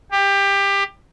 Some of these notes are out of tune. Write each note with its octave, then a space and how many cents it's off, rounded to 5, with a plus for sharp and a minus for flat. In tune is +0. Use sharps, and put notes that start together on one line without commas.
G4 +20